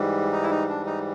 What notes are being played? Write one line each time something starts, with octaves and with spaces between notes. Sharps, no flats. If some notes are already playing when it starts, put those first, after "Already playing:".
Already playing: G#2 E3 G3
D#4
E4
D#4
D4
D#4